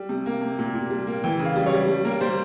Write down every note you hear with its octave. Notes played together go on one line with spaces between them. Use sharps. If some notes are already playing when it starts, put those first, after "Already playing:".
Already playing: G3
C3
A#3
C3
A#2
A#2
G3
A#3
E3 G5
C#3
F5
G3
C#5
G3
G3
A#3 A#4
G3 C5